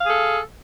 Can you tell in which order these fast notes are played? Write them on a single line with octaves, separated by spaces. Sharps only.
F5 G#4 A4